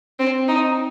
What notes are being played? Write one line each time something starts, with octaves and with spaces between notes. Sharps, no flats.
C4
D#4